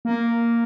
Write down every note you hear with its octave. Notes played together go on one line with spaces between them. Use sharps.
A#3